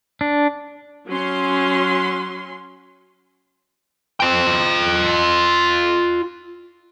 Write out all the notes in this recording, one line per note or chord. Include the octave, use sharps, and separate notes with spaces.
D4
F#3 C#4 C6
F4 G5